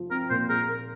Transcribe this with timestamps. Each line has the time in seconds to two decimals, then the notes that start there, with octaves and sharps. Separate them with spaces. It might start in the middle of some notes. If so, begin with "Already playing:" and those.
Already playing: F3 F4
0.10 C4 A#4
0.30 A#2 C5
0.49 G#4 A#4
0.68 A#3